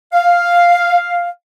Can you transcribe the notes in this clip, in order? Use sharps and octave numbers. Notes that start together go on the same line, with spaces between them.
F5